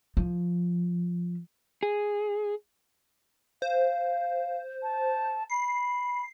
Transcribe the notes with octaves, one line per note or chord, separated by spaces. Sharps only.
F3
G#4
C5 F5
A5
B5 C7